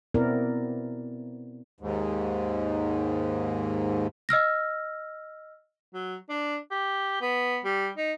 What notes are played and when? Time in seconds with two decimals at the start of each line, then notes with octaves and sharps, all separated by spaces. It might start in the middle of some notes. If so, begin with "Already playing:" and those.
0.14 B2 B3 C4 E4 A#4 D5
1.81 D#2 G#2
4.29 D#5 E6 F6 A#6
5.94 F#3
6.29 D4
6.71 G4
7.21 B3
7.65 G3
7.97 D#4